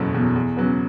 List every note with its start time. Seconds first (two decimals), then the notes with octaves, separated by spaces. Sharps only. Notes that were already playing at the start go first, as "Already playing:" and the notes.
Already playing: F#1 E2 B2 F#3 A4
0.14 E2 B2 F#3
0.36 E2
0.57 C#3 F#3 B3